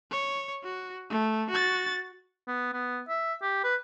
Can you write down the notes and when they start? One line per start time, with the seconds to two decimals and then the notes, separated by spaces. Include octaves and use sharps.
0.11 C#5
0.64 F#4
1.10 A3
1.50 F#4 A6
2.48 B3
2.73 B3
3.09 E5
3.42 G4
3.64 B4